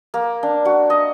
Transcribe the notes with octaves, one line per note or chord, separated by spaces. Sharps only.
A#3
D4
F#4
D#5